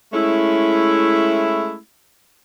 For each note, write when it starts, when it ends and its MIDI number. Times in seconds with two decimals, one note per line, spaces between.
0.14 1.77 56
0.14 1.77 57
0.14 1.77 61
0.14 1.77 64